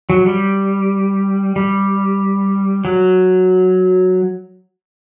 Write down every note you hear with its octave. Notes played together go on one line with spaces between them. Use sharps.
F#3
G3
G3
F#3